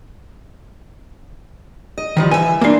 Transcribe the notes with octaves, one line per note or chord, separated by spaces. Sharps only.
D#5
D#3 F3 G3
E3 E5 G#5
E3 A#3 D4 C6